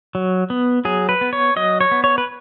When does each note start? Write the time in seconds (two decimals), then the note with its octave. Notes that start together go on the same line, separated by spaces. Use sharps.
0.15 F#3
0.50 B3
0.85 F#3 G#4
1.09 B4
1.21 B3
1.33 C#5
1.56 F#3 D#5
1.81 C#5
1.91 B3
2.04 C#5
2.18 B4